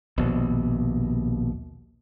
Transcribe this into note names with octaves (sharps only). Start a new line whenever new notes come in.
A#1 D#2 B2